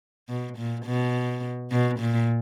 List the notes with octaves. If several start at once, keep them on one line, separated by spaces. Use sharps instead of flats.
B2
A#2
B2
B2
A#2